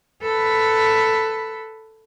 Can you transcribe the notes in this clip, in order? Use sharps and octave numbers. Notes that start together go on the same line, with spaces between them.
A4 B4